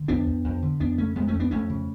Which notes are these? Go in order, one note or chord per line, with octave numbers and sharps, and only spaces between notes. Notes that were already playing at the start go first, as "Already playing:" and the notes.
Already playing: D3
F2 B3 D4
F2
F2
D3
F2 B3 D4
C#3 A3 C#4
F2 G#3 B3
A3 C#4
F2
B3 D4
F2 A3 C#4
C#3